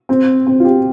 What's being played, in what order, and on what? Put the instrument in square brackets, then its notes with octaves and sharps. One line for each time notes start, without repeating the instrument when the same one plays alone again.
[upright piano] C4
C4
F4
G4